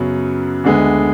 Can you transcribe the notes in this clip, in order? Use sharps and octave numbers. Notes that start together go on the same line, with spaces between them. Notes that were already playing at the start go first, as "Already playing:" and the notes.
Already playing: F#2 C#3 F#3 B3
D2 D3 G#3 B3